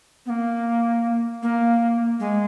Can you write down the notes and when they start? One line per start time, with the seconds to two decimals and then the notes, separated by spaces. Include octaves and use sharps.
0.26 B3
0.30 A#3
1.42 A#3
2.20 G#3